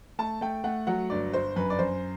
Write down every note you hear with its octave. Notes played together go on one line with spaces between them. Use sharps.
A3 A5
A3 G5
A3 F#5
F#3 F#5
G1 D5
G1 C5
F#2 B4
D5
F#2 C5